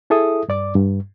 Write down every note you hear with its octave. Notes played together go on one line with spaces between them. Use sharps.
E4 G#4 A4 E5 D#6
G2 D5 D6
G2